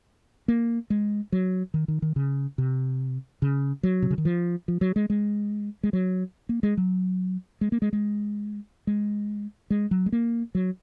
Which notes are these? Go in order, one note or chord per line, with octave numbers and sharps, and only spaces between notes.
A#3
G#3
F#3
D#3
D#3
D#3
C#3
C3
C#3
F#3
C3
C#3
D#3
F3
F3
F#3
G#3
G#3
G#3
F#3
A#3
G#3
F#3
G#3
A#3
G#3
G#3
G#3
G#3
F#3
G#3
A#3
F#3